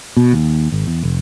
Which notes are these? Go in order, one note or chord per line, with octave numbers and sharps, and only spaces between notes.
B2
D#2
G#1
E2
F1